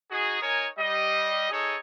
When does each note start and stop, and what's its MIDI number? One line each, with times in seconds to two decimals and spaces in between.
0.11 0.40 63
0.11 0.40 66
0.11 0.40 68
0.41 0.66 63
0.41 0.66 70
0.41 0.66 73
0.41 0.66 80
0.78 1.50 55
0.78 1.50 75
1.51 1.76 63
1.51 1.76 68
1.51 1.76 69
1.51 1.76 73